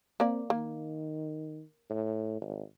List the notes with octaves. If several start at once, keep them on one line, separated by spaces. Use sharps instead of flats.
A#3 C4 D5
D#3 A#3
A2
G#1